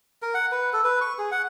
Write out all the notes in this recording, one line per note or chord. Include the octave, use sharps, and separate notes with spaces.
A#4
F#5
B4
A4
B4
C#6
G#4
F#5